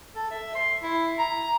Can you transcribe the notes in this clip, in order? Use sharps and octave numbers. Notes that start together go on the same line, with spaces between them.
A4
E5
C6
E4
A#5